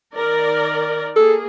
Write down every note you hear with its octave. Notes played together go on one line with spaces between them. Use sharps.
D#3 A#4 D5
A#3 G#4 A4